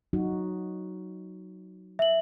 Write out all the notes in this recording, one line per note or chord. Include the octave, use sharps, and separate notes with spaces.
F#3 D#4 F#4
E5 F#7